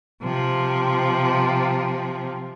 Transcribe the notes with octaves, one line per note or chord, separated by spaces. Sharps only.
C3 F3